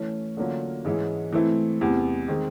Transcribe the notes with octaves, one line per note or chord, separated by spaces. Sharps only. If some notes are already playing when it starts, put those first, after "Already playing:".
Already playing: E3 A3 C#4
D3 F#3 A#3 C#4 F4
G#2 E3 G#3 C#4 E4
E3 A3 C4 E4
E2 C3 E3
D#3 G#3 C4